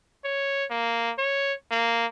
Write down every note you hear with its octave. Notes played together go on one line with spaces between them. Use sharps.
C#5
A#3
C#5
A#3